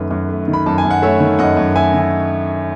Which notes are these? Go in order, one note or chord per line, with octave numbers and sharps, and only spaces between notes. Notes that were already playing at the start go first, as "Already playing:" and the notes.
Already playing: F#2 D#3 A3 B4
F#2
A3
D#3
B5
F#2 A5
G#5
F#2
F#5
A3 C#5 E5
D#3
F#2 D#5 F#5
F#2
A3 E5 G#5
D#3
G#5